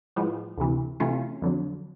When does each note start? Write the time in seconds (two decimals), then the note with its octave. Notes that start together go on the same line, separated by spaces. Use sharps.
0.16 A2 F3 G#3 B3
0.57 D2 C3 E3
1.00 C3 E3 A3 C#4 F4
1.42 F2 D3 F#3